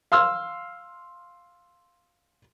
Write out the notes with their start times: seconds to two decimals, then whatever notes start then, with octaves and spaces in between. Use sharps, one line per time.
0.12 F5 C6 E6 F6